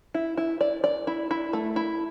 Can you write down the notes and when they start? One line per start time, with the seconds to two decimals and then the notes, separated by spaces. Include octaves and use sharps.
0.14 E4
0.38 E4
0.61 D5
0.84 D5
1.07 E4
1.31 E4
1.53 A3
1.76 E4